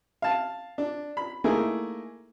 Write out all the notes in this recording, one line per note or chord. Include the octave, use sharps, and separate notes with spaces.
F5 A5
D4
B5
A3 A#3 D#4 E4 G#4 A#4